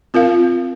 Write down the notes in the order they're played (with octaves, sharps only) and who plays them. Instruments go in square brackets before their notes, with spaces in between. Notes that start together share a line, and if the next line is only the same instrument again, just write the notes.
[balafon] C4 F4 A#4 F5